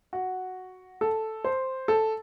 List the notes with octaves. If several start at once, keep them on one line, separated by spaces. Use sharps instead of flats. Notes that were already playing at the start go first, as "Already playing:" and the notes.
F#4
A4
C5
A4